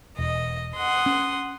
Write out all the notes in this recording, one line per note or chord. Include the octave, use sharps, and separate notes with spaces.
E1 D#5
F#5 C6 D#6
C#4